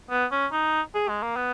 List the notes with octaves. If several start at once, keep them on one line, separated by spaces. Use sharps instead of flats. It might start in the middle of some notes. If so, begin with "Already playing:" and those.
B3
C#4
D#4
G#4
G#3
A#3
B3